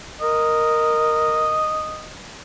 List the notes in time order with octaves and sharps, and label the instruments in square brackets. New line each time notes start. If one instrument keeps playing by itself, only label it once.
[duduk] A#4 [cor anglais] D#5